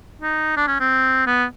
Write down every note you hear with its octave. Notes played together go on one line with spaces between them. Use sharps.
D#4
D4
C#4
C4
B3